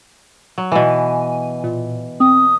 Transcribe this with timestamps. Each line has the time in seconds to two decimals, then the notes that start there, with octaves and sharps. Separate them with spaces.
0.58 F#3
0.72 B2 E3 G#5
1.64 A#2
2.20 C4 D#6